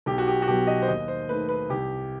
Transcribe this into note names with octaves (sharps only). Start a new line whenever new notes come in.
B1 G4
F#4
G4
F#4
B2 F#3 G4
D#5
C5
D#2 D#5
C5
D#3 A3 B4
B4
C2 G4